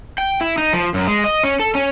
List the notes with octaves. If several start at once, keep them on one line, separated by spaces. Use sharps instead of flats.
G5
E4
D#4
F3
F#2
G#3
D#5
C#4
A4
C#4